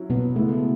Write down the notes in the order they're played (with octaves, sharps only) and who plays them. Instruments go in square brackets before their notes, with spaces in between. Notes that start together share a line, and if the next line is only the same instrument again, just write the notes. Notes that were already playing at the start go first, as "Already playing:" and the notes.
Already playing: [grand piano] F#3 C#4 E4
[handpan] B2 B3
[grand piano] C#3 G#3 B3 E4 [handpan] A3